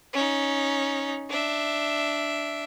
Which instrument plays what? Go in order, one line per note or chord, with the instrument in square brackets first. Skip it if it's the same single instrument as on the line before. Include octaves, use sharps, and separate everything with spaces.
[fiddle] C#4 D#4
D4 E5